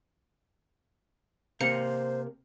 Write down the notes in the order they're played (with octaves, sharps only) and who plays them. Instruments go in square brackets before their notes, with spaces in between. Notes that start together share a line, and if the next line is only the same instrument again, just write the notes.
[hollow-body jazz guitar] C3 A#3 [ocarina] C5 [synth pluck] C#7